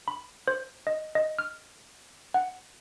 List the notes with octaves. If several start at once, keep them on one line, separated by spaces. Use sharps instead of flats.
B5
C5
D#5
D#5
F6
F#5